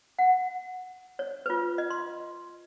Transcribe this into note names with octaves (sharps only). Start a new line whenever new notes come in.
F#5
C#5
F4 B4
D#5
C6